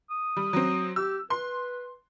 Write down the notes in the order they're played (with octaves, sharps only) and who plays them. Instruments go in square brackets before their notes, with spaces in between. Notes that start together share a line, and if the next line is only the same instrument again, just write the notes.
[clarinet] D#6
[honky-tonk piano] G3
F#3 C4
[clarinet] G4 [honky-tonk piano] E6
[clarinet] B4 [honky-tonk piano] C6